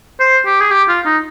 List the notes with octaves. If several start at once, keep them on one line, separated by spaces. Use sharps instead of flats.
C5
G4
G#4
G4
F4
D#4